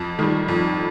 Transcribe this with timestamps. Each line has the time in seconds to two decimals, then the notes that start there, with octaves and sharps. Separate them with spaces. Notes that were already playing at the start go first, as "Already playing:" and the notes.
Already playing: F2 A5
0.19 D#3 G3
0.48 F2